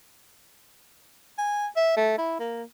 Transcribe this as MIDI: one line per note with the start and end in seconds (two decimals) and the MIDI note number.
1.38 1.67 80
1.77 1.96 76
1.97 2.13 57
2.18 2.38 64
2.40 2.63 58